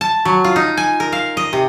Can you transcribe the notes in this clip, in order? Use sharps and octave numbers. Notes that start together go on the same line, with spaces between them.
A5
F#3
F4
D#4
G#5
A#4
F5
D#5
C3